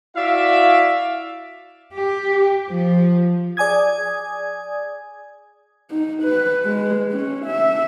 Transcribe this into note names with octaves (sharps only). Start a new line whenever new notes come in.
E4 F#4 D5 E5 F5
G4
F3
G#4 D5 G#5 D#6 G#6
D#4
B4
G#3
C#4
E5